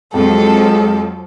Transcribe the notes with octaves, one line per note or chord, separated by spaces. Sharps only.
F2 F3 F#3 G#3 A4